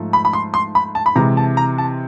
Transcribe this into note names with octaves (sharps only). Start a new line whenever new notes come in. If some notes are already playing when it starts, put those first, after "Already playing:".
Already playing: G#2 F3 A3
B5
B5
C6
C6
B5
A5
B5
C3 E3 G#3 A#5
A5
A#5
A5